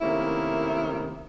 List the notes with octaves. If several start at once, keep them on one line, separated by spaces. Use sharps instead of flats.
C3 D#3 A3 A#3 C#4 E4